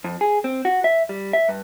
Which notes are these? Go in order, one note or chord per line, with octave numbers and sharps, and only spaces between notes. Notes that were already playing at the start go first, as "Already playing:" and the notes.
F2
G#4
C4
F#4
E5
G3
E5
G2